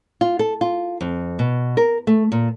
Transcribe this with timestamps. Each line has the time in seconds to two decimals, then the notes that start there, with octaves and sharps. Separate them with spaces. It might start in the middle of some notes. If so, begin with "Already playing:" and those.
0.21 F4
0.39 A4
0.61 F4
1.01 F2
1.39 B2
1.77 A#4
2.07 A3
2.32 A#2